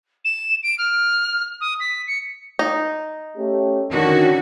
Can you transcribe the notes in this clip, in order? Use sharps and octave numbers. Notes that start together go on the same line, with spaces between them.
E7
D7
F6
D#6
B6
C#7
D#4
A3 C#4 G4
D3 D#3 C#4 F#4